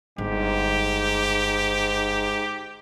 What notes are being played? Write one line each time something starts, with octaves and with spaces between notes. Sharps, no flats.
G1 G#2 G4